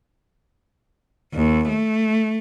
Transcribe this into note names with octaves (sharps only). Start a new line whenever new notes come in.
D#2
A3